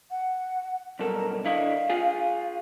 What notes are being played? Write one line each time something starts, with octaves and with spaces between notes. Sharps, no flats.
F#5
B1 G2 A4 A#4
D3 E4 D#5 F5
F4 G#4